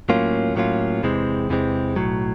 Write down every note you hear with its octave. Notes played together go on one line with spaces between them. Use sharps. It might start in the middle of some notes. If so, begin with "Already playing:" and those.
A2 F#3 A#3 C#4 F4
A2 F#3 A#3 C#4 F4
E2 C3 E3 G#3 C4
E2 C3 E3 G#3 C4
B1 A2 F#3